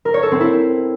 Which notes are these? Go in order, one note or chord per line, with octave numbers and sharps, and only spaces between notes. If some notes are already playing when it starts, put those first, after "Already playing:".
A#4
C#5
A4
C4
E4